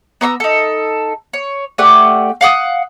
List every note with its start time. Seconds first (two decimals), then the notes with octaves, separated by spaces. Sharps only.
0.21 B3 A#5 C6 E6
0.40 D#4 A4
1.33 C#5
1.78 A3 G4 D5 F#5
2.41 F5 F#5 D#6